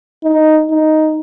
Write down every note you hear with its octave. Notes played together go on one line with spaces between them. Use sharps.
D#4
D#4